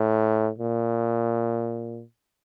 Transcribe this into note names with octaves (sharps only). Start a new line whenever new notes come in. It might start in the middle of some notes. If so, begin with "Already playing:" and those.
Already playing: A2
A#2